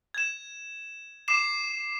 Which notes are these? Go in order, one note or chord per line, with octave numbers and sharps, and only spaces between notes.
G#6 E7
D6 C7 E7